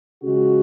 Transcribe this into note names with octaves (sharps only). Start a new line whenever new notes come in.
C#3 F3 G#3 F#4